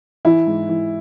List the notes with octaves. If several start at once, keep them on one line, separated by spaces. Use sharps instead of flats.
E3 E4
G#2
E3